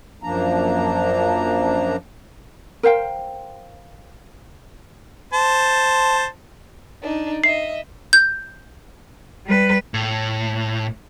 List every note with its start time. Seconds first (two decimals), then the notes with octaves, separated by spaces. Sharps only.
0.23 F#2 F3 A#3 D4 A#5
2.83 A#4 C5 F5 G5
5.33 C5 A5
7.02 D4 D#4
7.44 D#5 E5 C7
8.13 G6
9.46 G3 B4
9.94 A2